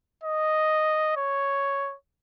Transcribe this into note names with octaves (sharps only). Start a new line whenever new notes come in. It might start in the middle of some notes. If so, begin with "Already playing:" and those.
D#5
C#5